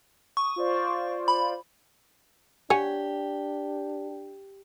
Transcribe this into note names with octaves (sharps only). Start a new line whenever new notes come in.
C#6 D#6
F4 C5 D5
B5
D4 G4 C#5 F#5 G#5